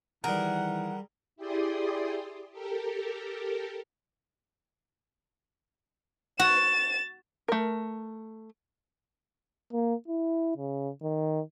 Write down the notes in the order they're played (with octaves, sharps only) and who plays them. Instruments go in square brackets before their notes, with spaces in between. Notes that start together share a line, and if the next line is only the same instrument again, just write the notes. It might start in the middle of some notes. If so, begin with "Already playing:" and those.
[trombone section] D#3 E3 [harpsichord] G3 G#4 [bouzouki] A#4 [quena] F#5
[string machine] E4 G4 G#4 D5 C6 D#6
G4 A4 A#4
[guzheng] F#4 [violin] A6 E7
[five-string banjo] A3 A#4
[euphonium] A#3
E4
C#3
D#3